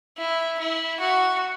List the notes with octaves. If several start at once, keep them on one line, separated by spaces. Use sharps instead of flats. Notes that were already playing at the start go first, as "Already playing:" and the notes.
E4
E4
F#4